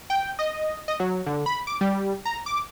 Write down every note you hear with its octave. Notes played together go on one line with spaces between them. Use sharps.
G5
D#5
D#5
F#3
D3
B5
D6
G3
A#5
D6